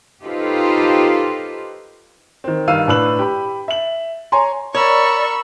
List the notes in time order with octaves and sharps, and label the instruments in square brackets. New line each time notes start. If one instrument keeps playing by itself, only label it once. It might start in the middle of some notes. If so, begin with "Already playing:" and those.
[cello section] D#4 F4 G4 A4 B4 C5
[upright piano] D#3 C4
G2 D#3 F5 E6 D#7
A2 D4 B4 E6 F#7
G4 B5
E5 F#7
C#5 G#5 A#5 C6
[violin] A#4 C#6 [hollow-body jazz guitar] C#5 [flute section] D5 [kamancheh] B5 E6